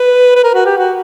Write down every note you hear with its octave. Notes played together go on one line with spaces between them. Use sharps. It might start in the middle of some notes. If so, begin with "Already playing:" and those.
Already playing: B4
B4
A#4
F#4
G4
F#4